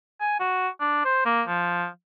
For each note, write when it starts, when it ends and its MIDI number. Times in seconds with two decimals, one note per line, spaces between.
0.21 0.38 80
0.40 0.68 66
0.80 1.03 62
1.05 1.24 72
1.26 1.42 58
1.48 1.86 53